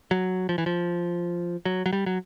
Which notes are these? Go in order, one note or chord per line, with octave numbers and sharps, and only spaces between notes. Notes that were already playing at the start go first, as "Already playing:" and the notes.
F#3
F3
E3
F3
F#3
F#3
G3
F#3